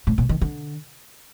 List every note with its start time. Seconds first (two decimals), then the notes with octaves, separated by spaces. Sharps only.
0.07 A2
0.18 A#2
0.29 D#3
0.42 D3